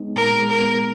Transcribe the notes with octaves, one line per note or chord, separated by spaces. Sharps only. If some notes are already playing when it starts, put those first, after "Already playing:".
Already playing: G#3 B3 D#4
A#2 A#4
G#3
A#4
B3